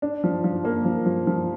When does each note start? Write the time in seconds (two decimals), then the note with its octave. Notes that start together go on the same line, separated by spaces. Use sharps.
0.02 D4
0.24 F3
0.44 F3
0.65 A#3
0.85 F3
1.06 F3
1.27 F3